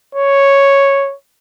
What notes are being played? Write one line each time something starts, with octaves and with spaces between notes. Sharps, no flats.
C#5